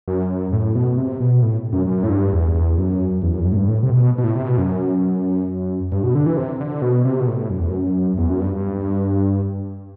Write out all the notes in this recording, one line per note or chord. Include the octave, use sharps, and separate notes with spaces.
F#2
A2
B2
C3
B2
A2
F#2
F#2
A2
G2
E2
E2
F#2
E2
F#2
E2
F#2
A2
G2
A2
C3
B2
B2
A2
C3
B2
F#2
G2
B2
D3
E3
C3
D3
B2
C3
B2
A2
F#2
E2
F#2
E2
F#2
G2